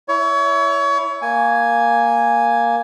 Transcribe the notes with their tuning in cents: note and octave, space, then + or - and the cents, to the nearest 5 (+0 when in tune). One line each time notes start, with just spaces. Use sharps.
E4 +0 C#5 +30
A#3 +0 G#5 +0